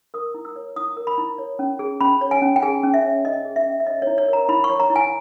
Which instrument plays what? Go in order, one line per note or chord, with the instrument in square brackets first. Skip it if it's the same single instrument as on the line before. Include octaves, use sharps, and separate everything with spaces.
[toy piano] A#4 D#6
E4
E6
C#5
E4 D#6
A#4
B5
E4
C#5
C#4
G#4
C#4 B5
C#5
G#5
C#4
G5
G#4 G#5
C#4
E5
C#5
C#4 D#5
G#4
E5
C#4
E5
C#5 D#5
E4 C#5
C#5
A#4
A#5
E4 B5
C#6
C#5
A#5
E4
G#5